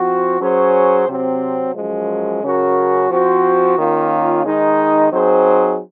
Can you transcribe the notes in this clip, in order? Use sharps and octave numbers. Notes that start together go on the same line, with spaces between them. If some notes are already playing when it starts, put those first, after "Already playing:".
Already playing: F3 C4 F#4
F#3 C#4 G#4 C5
C3 F#3 C4
F#2 F3 G#3
C#3 F#3 C#4 F#4 A#4
F3 C4 F#4 C5
D#3 A#3 C#4 F4
D#3 G#3 D#4
F#3 C4 D#4 G#4 C5